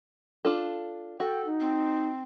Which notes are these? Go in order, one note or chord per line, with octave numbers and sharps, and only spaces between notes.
D4 F4 A4
F#4 A4 G5
D#4
C4